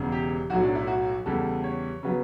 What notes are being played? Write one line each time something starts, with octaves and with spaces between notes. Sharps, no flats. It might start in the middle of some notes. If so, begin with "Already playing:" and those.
Already playing: E1 E2 C#3
G4
B1 A2 F#3 F#4
D4
E4
F#4
E2 C#3 G3 A4
C#5
C#3 F#3 B3